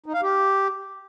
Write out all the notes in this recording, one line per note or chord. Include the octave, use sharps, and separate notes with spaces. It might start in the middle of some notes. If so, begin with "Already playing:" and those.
D#4
F5
G4